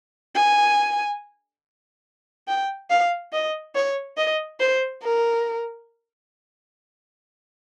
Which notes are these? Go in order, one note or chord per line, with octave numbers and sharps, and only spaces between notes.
G#5
G5
F5
D#5
C#5
D#5
C5
A#4